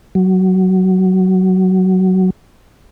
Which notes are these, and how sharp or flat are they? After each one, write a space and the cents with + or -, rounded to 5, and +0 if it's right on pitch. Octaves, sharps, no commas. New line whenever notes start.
F#3 +15